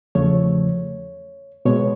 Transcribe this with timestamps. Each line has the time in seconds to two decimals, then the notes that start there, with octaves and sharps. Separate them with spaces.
0.15 E2 C#3 F3 A3 C#5
1.65 B2 G#3 C#5